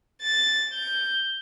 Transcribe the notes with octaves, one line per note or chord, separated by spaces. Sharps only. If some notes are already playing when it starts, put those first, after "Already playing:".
A6
G6